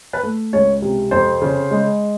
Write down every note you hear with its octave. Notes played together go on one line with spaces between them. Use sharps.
B4
A3
C#2 C#5
C3
F2 C5
C#3
G#3